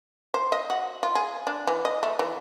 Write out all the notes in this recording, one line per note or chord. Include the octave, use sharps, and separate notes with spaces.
C5
D#5
F#4
F4
G#4
D4
E3
D#5
A3
E3